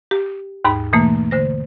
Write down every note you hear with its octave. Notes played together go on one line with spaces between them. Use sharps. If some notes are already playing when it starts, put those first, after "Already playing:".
G4
D#2 G#2 D#4 B5
B2 E3 A3 A#3
D3 C5 A#6